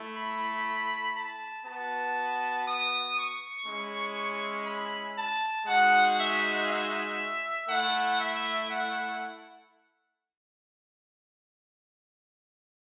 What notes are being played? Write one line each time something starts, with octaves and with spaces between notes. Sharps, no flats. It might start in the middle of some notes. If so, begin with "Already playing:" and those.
Already playing: A3 E4
B5
A5
B3 F#4 A5
D#6
C#6
G#3 C#4 E4
B5
A5
G#3 D#4 F#4 F#5
E5
E5
A3 E4 F#5
E5
F#5